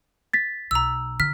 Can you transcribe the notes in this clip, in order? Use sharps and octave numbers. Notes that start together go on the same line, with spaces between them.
A6 B6
B1 A#5 E6
D3 F6 B6